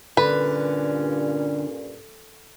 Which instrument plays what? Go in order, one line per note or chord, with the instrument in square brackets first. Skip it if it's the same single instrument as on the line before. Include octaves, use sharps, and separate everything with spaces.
[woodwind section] G2 A#2 C#4 [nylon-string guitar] D3 [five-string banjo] B4